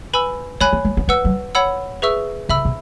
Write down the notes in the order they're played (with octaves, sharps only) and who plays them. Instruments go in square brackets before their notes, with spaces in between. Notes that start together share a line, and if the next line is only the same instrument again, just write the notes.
[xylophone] B4 G#5 B5 E6
[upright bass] G#3 [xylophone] C#5 G#5 B5 F#6
[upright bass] B3
G#3
B3
[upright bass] G#3 [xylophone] B4 F#5 E6
[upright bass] F#3
[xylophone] C#5 F#5 B5 E6
G#4 B4 E5 C#6 E6
[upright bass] C#3 [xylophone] E5 B5 E6
[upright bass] B2